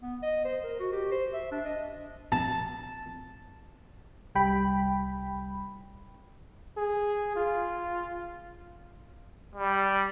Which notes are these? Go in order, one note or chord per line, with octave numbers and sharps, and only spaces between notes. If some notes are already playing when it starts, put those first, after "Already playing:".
B3
D#5
C5
A#4
F#4
G4
C5
E5
D4
D#5
A5
C2 G3 G5 B5
G#4
F4
G3